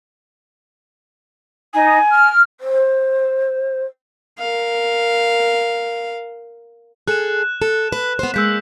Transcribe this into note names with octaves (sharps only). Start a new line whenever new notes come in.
D#4 G#5
F6
C5
A#4 F5
G#4 A4 F#6 E7
A4 E7
B4
B3 C5
G#3 A#3 E6 G6 B6